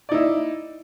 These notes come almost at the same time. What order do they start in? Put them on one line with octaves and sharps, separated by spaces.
D5 D#4 E4